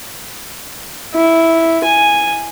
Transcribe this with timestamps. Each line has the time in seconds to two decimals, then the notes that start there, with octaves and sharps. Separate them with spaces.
1.14 E4
1.84 G#5